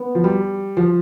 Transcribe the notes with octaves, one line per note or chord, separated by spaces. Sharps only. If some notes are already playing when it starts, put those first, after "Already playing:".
Already playing: B3
F3
G3
F3